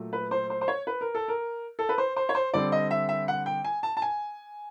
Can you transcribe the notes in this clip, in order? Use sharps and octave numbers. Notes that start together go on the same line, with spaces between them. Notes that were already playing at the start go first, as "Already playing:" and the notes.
Already playing: A#2 F#3 A3
B4
C5
C5
C5
C#5
B4
A#4
A4
A#4
A4
B4
C5
C5
C#5
C5
D3 G3 C4 D5
D#5
E5
E5
F#5
G5
G#5
A5
A5
G#5